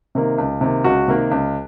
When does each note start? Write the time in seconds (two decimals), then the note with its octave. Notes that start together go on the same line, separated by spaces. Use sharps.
0.15 C3 D#3 A#3
0.38 C#2
0.61 C3 D#3 A#3
0.84 C#2 F#4
1.08 C3 D#3 A#3
1.31 C#2